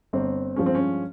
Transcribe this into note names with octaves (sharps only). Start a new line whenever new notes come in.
G1 C4
G2 F3 G#3 C#4
C4
C#4